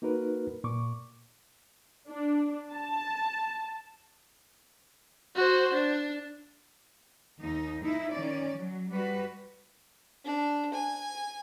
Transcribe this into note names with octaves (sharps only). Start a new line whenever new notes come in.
A#3 D#4 F#4 A#4 B4
A#2 C#6 D6
D4
A5
F#4 C5
D4
D#2 D#4
D#4 E4
D#3 C#4 D5
F#3
G3 F#4 B4
D4
G#5